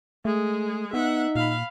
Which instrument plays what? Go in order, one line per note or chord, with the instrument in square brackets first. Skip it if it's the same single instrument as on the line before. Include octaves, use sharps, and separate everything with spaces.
[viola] G#3 G#4 [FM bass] A3
[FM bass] B3 [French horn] D#4 [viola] E5 F#5
[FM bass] A#2 [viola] F5 B5